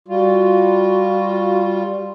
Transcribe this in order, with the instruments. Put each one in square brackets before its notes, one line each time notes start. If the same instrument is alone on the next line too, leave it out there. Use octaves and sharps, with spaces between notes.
[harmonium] G3 F4 [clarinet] F#4